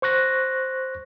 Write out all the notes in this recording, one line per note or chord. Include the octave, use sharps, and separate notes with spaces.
C5 C#6 F#6 A#6